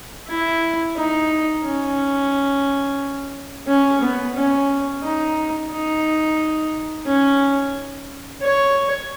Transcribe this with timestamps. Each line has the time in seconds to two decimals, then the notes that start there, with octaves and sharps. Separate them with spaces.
0.28 E4
0.96 D#4
1.64 C#4
3.67 C#4
4.01 B3
4.35 C#4
5.03 D#4
5.71 D#4
7.07 C#4
8.42 C#5